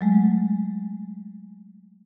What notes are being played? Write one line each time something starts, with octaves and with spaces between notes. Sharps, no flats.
F#3 G#3 A3